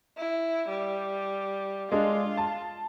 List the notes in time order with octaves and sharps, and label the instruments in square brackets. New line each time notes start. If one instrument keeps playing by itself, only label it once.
[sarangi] E4
G3
[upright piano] G#3 D4 [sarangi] F4
[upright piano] A5